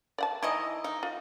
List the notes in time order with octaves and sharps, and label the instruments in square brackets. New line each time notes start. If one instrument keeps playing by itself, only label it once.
[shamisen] D5 F#5 A5
[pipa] D#3 E3 D#5 [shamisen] E4 D5
[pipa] D#4 [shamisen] F5
[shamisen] F4